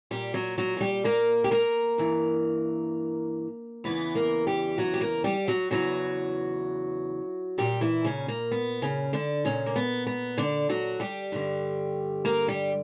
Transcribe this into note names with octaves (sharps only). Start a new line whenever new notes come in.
A#2 G3 G4
F#3 F#4
F#3 F#4
F#4
G3 G4
A#3 A#4
G4
A#3 A#4
G2 E3
E2 C#3 E3 B3 B4
A#3 A#4
G3 G4
F#3 F#4
G4
A#3 A#4
G3 G4
F#3 F#4
E2 C#3 E3 F#3 F#4
A#2 G3 G4
E3 E4
C#3 C#4
A#3
B3
C#3 C#4
D3 D4
A#2 C#3 C#4
A#3
B3
B3
D3 D4
F#3 F#4
G3 G4
G2 D3
A#3 A#4
G3 G4